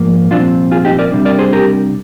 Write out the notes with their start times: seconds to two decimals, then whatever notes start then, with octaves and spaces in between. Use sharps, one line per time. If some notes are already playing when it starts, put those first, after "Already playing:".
Already playing: G#2 F3 A#3
0.31 C2 A#2 F3 C4 D4 F4
0.71 F4 G#4
0.85 D#4 G4
0.99 A#4 D5
1.12 C2 C3 G3 D4
1.25 A#4 D5
1.39 G#4 C5
1.53 G4 A#4